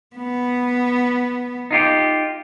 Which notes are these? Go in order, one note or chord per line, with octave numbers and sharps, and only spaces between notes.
B3
D#4 F4 G4